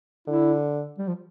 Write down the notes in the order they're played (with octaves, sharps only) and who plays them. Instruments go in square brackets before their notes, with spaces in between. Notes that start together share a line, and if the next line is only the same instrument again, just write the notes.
[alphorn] D3 [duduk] E4
[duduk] G3
F3